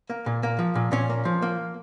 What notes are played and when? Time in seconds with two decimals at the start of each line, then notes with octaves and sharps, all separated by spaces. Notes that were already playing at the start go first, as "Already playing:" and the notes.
0.10 A#3
0.26 A#2
0.43 A#3
0.59 F3
0.75 A#2
0.92 A#2 C#4
1.09 A#3
1.25 F3
1.42 A#3